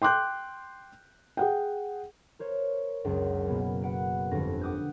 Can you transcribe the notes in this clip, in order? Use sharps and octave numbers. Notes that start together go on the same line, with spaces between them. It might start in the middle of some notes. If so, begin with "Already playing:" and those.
G5 C6 D6 F#6 G6
G#4 F#5 G5
A#4 C5 C#5
F#1 C#2 F#2
B2 A#3 B3 C#4
B4 F#5 D7
G1 F2 A#6
F#5 D6 D#6 F#6 G6